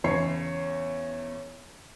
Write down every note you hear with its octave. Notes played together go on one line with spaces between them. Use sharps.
E2 C#3 C#5 C7